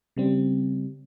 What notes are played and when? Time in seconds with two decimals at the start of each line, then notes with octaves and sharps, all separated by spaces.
0.16 C#3 G3 C4